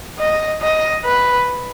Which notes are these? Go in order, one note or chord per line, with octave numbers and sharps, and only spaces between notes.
D#5
D#5
B4